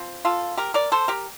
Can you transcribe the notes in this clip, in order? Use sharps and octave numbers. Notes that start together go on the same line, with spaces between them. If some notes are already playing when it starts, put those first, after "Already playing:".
Already playing: F3 C4
F4 A4
G4 A#4
A#4 D5
A4 C5
G4 A#4